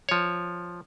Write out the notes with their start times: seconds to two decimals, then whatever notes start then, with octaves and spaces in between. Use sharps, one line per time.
0.09 F3 C#5